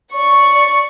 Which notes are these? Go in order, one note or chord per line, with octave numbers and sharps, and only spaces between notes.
D5 C#6